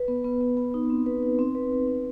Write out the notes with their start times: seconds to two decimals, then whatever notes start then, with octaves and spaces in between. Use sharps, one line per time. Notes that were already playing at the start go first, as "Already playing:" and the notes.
Already playing: B4
0.08 B3
0.24 B3
0.41 B3
0.57 B3
0.74 D#4
0.90 C4
1.06 B4
1.23 D#4
1.39 C4
1.55 B4
1.72 B4
1.87 C4